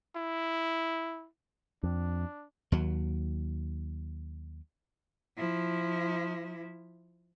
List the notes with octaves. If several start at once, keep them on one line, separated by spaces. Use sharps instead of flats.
E4
F2 D4
D#2 F#3
F3 E4